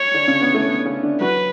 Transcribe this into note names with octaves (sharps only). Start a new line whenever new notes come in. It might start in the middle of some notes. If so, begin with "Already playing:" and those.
Already playing: C#5
D3 D4
C#3 C#4
B3
A3
B3
C#3 C#4
D3 D4
F#3 F#4 B4